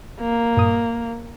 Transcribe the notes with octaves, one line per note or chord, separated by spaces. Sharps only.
A#3
G2 A#2 D#6